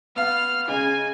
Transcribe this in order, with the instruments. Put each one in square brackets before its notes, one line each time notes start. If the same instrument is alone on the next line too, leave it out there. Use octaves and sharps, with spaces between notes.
[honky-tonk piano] B3 F5 [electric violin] F6
[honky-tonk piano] C#3 G#3 [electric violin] G#5